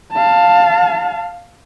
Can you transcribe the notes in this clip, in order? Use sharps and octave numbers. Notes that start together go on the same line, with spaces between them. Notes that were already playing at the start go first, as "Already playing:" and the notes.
F5 A5